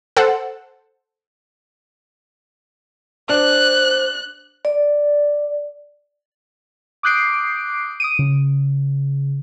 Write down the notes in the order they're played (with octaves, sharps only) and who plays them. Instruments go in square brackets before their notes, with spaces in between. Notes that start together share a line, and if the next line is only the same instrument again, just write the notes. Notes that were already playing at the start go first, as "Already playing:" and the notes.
[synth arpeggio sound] A4 C5 F#5
[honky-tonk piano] D4 [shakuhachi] C5 [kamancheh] F#6
[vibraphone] D5
[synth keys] D6 D#6 F#6 G6 C7 D7
D#6 D7 D#7
C#3